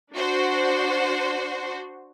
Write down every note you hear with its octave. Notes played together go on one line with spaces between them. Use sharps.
D4 F#4 C5